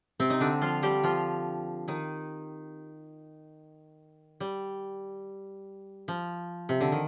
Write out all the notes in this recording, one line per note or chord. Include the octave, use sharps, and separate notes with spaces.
C3 C4
D#4
D3 D4
F3 F4
G3 G4
F3 F4
D#3 D#4
G3
F3
C3
D3
D#3